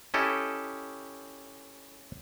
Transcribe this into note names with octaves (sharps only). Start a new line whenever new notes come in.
C#4 E4 G4 A4 D#5